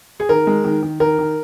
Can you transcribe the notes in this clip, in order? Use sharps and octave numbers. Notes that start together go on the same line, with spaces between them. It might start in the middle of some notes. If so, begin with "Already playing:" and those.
G#4
D#3 A#4
G#3
D#3
D#3
D#3 A#4
D#3